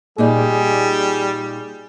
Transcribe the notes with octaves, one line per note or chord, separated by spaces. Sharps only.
A#2 G3 D#4 G#4 D5